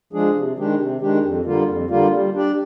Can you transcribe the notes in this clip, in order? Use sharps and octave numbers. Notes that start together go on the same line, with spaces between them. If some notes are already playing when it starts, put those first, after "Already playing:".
F3 G#3 D4 G#4
C3
D#3 G#3 D4 G4
C3
D#3 G#3 D4 G4
F2
D3 G3 A#3 F4
F2
D3 G3 A#3 F4
G3
D4 G4 D5